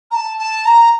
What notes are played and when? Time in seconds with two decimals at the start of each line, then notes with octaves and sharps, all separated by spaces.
0.11 A#5
0.14 A5
0.38 A5
0.65 A#5